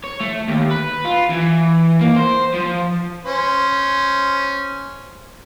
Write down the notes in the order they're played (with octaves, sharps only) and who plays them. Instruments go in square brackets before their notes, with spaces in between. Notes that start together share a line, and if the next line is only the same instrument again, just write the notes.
[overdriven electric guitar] C#5
A3
D#2
B4
F4
E3
A#3
C5
F3
[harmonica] C#4 C5